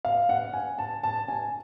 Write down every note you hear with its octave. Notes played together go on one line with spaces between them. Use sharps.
F5
F#5
G#5
A5
A5
G#5